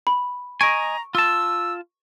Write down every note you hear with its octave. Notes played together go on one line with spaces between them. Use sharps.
B5
D#5 G#5 A#5 C#6 D7
F4 A5 E6